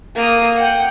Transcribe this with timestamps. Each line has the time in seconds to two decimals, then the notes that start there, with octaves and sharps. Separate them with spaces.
0.15 A#3 D#6
0.56 F#5 G5